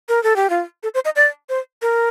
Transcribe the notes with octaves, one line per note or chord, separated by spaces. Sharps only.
A#4
A4
G4
F4
A4
C5
D#5
D5
C5
A#4